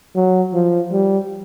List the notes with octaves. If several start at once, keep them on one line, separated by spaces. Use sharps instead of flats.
F#3
F3
G3